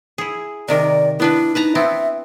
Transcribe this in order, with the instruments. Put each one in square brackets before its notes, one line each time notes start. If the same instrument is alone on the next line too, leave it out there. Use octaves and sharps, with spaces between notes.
[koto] E4 G#4
[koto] C3 D#3 A#4 [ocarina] D5
[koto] B3 D4 B4 [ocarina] E4
[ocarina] D#4 [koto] B4 A5 A#5
[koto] B3 C4 E4 [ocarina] E5